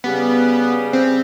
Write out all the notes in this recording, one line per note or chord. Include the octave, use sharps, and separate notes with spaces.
C#3 G3 B3 G4
C4